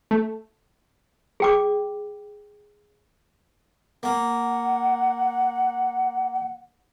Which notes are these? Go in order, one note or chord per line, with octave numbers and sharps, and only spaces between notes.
A3
G#4 G5 D6
A#3 F#5